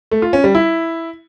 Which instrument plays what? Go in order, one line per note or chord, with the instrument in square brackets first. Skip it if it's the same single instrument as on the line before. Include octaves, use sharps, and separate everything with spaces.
[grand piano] A3
F4
C#4
G3
E4